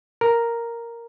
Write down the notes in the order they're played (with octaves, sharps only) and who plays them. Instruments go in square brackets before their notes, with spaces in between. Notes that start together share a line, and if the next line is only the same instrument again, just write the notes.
[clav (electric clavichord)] A#4